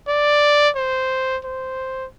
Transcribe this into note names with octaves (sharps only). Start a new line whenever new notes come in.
D5
C5
C5